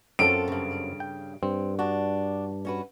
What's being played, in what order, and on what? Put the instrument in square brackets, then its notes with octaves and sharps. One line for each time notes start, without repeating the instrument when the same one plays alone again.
[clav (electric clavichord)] F#2 F#3 C4 [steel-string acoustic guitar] F4 A4 [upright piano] D7
[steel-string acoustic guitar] G2 C#3
[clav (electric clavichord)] G5
[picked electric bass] G2 [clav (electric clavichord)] C4
[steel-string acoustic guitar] D4 [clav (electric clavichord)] F#4
[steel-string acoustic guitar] C#4 F#4 B4